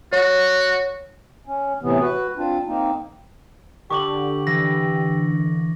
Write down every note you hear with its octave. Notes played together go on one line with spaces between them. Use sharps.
F#4 C#5
C#4
A2 C3 E3 B3
F#4 B4
C4 D4 F4
A#3 C4 D#4
D3 G4 C#6 D6 F#7
E3 A#6